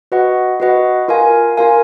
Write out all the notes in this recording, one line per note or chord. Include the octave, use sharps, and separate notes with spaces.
F#4 B4 D#5 F#5
F#4 B4 D#5 F#5
F4 A#4 F5 G#5
F4 A#4 F5 G#5